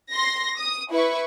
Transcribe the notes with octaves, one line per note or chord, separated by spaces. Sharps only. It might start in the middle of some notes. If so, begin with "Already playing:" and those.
C6 A#6
D#6
E4 B4 C#6